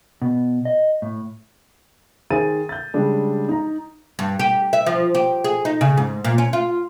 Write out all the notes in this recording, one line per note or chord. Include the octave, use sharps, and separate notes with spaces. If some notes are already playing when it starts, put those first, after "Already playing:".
B2
D#5
A2
D#3 G#4 C5 G#5 A6 D#7
G6 A6
C#3 G3 G#3 D4
D#4 A#5
G2
G4
E5
F3
G4
G#4
D#4
C#3
G#2
A#2
C#4
F4